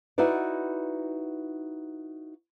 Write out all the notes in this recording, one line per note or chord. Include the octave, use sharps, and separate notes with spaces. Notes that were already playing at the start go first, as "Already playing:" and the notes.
D#4 E4 F#4 B4 D5